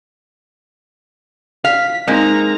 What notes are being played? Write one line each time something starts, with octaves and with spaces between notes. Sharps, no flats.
F5 B6
G#3 A#3 C4 D#4 A#5